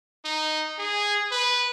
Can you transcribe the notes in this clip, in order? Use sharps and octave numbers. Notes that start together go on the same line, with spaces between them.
D#4
G#4
B4